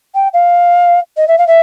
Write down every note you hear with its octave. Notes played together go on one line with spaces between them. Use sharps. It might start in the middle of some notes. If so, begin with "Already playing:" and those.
G5
F5
D#5
E5
F5
E5